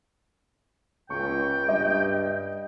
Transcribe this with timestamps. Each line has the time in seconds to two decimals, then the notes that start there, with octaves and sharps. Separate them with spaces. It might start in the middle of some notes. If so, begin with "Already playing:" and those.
1.10 C#2 G5 C#6
1.69 G2 D#5